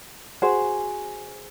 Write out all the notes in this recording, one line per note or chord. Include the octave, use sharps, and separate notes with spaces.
F#4 G#4 C5